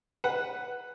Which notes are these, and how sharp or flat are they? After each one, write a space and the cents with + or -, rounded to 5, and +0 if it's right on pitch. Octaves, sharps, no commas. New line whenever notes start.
B4 +0 F#5 +0